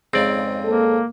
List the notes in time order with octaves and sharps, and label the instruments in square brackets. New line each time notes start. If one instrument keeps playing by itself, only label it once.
[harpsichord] F2 G#2 C#3 [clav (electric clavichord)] C4 D5
[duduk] A#3 [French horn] A4